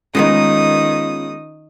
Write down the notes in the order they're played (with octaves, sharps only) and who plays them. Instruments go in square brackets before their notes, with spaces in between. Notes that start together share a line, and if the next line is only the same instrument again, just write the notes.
[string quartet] D#3 D#6 [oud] G#3 B3 D#4 [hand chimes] C#4 F4